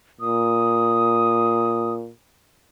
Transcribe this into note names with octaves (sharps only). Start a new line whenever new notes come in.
A#2 D#6